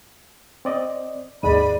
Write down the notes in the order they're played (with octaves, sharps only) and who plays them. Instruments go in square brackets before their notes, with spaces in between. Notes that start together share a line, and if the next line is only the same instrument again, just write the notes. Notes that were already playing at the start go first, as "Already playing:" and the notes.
[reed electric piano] C4 D5 D#5
[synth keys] D#2 D#7 [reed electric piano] G#2 G#3 [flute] D5 [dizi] B5